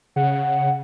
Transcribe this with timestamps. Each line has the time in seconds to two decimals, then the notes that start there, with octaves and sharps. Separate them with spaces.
0.16 C#3 F#5